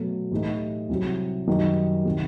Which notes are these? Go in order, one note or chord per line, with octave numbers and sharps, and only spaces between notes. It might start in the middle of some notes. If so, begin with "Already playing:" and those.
Already playing: B2 F#3 A3
A2 E3 A3 D#4 G4
C2 C3 F#3
F#2 D#3 G3 D#4
C3 D#3